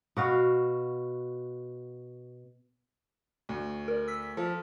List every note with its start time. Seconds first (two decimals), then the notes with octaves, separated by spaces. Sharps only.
0.17 B2 F#4 F5
3.49 D2
3.88 A#4 D5
4.08 E6 B6
4.37 F3 A4